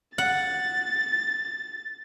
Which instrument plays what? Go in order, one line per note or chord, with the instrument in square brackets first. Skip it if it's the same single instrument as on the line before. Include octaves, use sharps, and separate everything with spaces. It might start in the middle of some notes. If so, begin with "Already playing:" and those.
[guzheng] F#5 [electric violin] A6